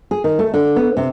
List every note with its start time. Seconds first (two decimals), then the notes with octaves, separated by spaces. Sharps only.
0.11 G#4
0.24 D#3
0.39 A3
0.54 D3
0.76 B3
0.97 C3